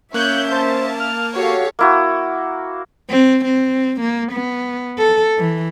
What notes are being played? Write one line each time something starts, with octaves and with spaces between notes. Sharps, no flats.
A#3 C#4 C#5 E5 F#6 G6
C5 A5
F6
F#4 G4 A4 C#5 F5
A#3 E4 F#4
C4
C4
A#3
B3
A4
E3